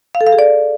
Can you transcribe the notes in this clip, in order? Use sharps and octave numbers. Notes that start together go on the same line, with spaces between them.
F5
A4
F5
G#4
D5